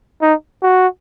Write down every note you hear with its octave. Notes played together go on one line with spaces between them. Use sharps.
D#4
F#4